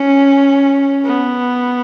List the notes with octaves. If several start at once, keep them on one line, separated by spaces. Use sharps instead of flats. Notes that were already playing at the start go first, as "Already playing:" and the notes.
Already playing: C#4
B3